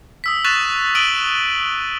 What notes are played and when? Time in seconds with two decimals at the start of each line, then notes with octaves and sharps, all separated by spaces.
0.24 D#6 E6 B6
0.44 C#6 F#6 A6 B6 E7 F7
0.95 D#6 E6 D7 D#7 F#7 G7